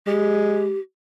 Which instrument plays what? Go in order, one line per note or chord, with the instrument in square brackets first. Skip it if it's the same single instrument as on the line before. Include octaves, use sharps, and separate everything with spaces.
[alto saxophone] G#3 [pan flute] G4